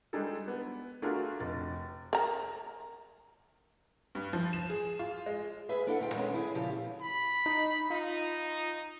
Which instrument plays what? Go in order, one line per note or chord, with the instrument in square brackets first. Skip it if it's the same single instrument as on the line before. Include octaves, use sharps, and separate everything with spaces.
[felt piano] G3 G#3 D4 D#4 G#4 A4
B3
A3 D4 F4 F#4 G#4 A#4
F1 A6
[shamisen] A#4 A#5
[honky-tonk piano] G2
F3
E7
G#4
F4
G#3
[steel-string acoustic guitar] G#4 B4 E5
A#3 D4 E4 A4 F#5
D2 G#2 C5 G5
D#3 G#3 A#3 B3 C#4
E4 G#4
A#2 C#3 F3 G4 A5
[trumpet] B5
[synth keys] D#4
[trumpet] D#4 [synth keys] F4